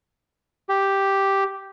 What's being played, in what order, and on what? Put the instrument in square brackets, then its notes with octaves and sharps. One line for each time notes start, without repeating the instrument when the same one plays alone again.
[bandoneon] G4